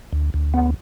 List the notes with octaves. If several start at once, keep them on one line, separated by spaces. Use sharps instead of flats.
D2
D2
B3